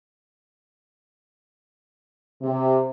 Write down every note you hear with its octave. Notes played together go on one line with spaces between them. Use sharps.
C3